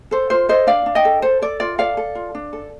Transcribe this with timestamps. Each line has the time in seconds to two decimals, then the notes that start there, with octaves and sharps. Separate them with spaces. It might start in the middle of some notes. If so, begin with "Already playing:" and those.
0.11 A4 C5
0.30 F4 C5
0.49 A4 C5 D#5
0.67 D4 D5 F5
0.86 D4
0.95 D#5 G5
1.05 A4
1.22 A4 C5
1.42 A4 D5
1.60 F4 D5
1.78 A4 D5 F5
1.97 A4
2.15 F4
2.35 D4
2.53 A4